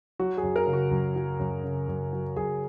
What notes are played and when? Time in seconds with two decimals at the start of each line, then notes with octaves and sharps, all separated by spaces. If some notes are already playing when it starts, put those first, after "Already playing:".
0.19 F#3 F#4
0.37 G#4
0.43 F#2
0.56 A#4
0.67 C#3
0.73 F#4
0.91 F#2
1.16 F#3
1.39 F#2
1.64 C#3
1.88 F#2
2.13 F#3
2.36 F#2 G#4